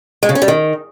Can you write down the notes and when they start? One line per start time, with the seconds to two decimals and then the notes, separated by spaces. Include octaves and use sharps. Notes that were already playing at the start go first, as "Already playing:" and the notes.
0.23 G#3
0.29 C#3
0.35 C#4
0.42 G3
0.48 D#3